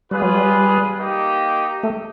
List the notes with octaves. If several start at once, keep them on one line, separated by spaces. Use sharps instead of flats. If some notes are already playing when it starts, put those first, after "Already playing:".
G3 F4 G#4 B4
F#3
G3
A#3 D#4 G4
A3